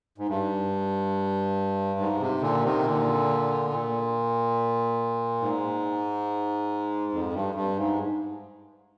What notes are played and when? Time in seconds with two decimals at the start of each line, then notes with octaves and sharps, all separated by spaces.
0.18 G#2
0.28 G2
2.00 G#2
2.20 C3
2.41 A#2 D3
2.64 C3 D#3
2.84 A#2 D3
3.70 A#2
5.41 G#2
7.12 F2
7.33 G2
7.55 G2
7.77 G#2